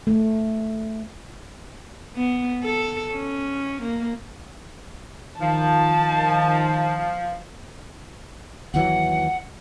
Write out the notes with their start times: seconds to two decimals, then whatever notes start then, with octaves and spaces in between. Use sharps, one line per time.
0.07 A3
2.16 B3
2.63 A4
3.14 C#4
3.83 A#3
5.40 D#3 F3 A5
8.74 D#2 E3 F#3 F#5